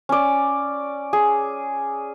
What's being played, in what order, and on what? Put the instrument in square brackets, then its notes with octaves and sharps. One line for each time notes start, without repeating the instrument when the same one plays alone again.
[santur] C#4 D5
G#4